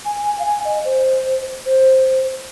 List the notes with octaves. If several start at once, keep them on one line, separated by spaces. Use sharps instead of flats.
G#5
G#5
F5
G#5
D#5
C5
C5